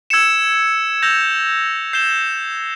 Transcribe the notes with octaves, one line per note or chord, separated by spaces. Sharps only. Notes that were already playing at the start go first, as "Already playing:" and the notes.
E6 G#6 C#7 E7
E6 G6 A#6 F7
G6 C7 E7 G7